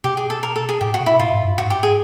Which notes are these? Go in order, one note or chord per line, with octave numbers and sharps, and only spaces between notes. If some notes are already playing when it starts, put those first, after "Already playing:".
B2 G4
G#4
A4
A#4
A4
G#4
A2 G4
F#4
B2
E4
A2 F4
G#2
G2
G#2 F#4
G4
G#4